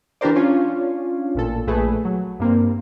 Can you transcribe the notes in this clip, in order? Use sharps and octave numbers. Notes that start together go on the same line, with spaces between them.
E3 D4 G4 A#4 C5 D5
C#4 D4 F4 C#5
A1 A#2 A4
A#1 A3 G#4 B4
F#3
G2 A#3 C4